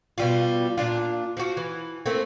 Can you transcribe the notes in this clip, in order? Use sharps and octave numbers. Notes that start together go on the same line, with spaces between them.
B2 G3 F4
A#2 D4 F4
F3 F#4
E3
A3 A#3 C4